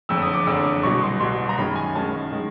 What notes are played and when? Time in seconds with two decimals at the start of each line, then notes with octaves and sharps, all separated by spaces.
0.09 F#1 F2 D3 E6
0.22 D#6
0.33 D6
0.46 F#1 F2 D3 E6
0.83 C2 B2 F#3 C#6
1.03 C6
1.20 C2 B2 F#3 C6
1.49 A#5
1.58 F#2 D#3 G#3 C#4 B5
1.76 G#5
1.95 F#2 D#3 G#3 C#4 A5
2.32 D#3 G#3